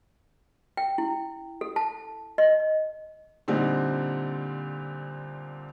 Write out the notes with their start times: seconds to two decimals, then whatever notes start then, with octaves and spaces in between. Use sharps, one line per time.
0.77 G5
0.98 E4
1.61 A4
1.76 A5
2.38 D#5
3.48 A#2 D3 G3 C4 D#4